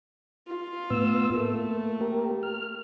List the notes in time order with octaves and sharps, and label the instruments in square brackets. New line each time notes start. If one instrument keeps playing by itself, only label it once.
[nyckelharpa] F4
[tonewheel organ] A2 B3 E6
[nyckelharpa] A3 [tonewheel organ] A#3
[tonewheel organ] A#3 G4 A#4
F6